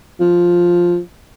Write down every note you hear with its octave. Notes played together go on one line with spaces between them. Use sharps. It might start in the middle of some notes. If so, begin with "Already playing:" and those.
F3